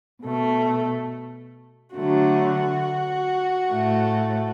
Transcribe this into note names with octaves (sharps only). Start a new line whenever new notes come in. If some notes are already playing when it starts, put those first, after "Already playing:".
B2 A3
D3 F#3 A3 F#4
A2 A3